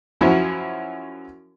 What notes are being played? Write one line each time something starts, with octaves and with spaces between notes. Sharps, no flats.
F#2 F3 F#3 C#4 E4